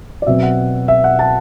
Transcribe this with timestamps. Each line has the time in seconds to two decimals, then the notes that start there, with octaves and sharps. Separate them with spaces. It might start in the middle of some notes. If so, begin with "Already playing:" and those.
0.22 D5
0.27 B2 F#3 C4 E5
0.43 F#5
0.88 E5
1.04 F#5
1.19 A5